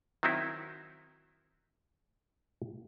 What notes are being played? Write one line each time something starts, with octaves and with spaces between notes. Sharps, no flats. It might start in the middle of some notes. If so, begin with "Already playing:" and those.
D#3 F#3 C4 D#4 E4